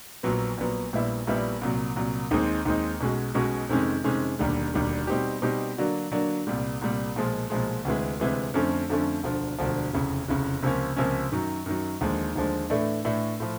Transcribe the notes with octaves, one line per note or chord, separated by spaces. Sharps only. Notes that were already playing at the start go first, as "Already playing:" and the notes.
A#1 A#2 F#3 B3
A#1 A#2 F#3 B3
A#1 A#2 G3 B3 E4
A#1 A#2 G3 B3 E4
C2 A#2 F#3
C2 A#2 F#3
D#2 D#3 G#3 C4 D#4
D#2 D#3 G#3 C4 D#4
B1 B2 G#3 C#4 F#4
B1 B2 G#3 C#4 F#4
F2 C3 D#3 G#3 C#4
F2 C3 D#3 G#3 C#4
E1 D#2 D3 G3
E1 D#2 D3 G3
B2 G3 C4 D#4 G4
B2 G3 C4 D#4 G4
D3 F#3 A#3 D4 F#4
D3 F#3 A#3 D4 F#4
C2 A#2 G3
C2 A#2 G3
B1 A#2 F3 G#3
B1 A#2 F3 G#3
D2 C3 E3 G#3
D2 C3 E3 G#3
F2 D3 F3 A3 C#4
F2 D3 F3 A3 C#4
E1 D2 D3 F3
E1 D2 D3 F3
F1 E2 C#3
F1 E2 C#3
C#2 C3 F3 A#3 C#4
C#2 C3 F3 A#3 C#4
F#2 D#3 F#3
F#2 D#3 F#3
D#2 D3 F3 G#3
D#2 D3 F3 G#3
A2 E3 A3 D4
A2 E3 A3 D4
A2 F3